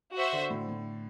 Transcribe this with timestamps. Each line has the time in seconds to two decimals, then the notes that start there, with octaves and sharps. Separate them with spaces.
0.14 F#4 C5 E5
0.33 D3
0.50 A2
0.69 A2